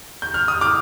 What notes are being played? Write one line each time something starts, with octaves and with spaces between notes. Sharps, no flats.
G6
F6
D#6
D6 F6